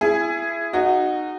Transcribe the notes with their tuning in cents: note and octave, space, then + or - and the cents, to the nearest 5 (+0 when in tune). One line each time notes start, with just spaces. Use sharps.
E4 +25 G#4 +0
D#4 -25 F#4 +0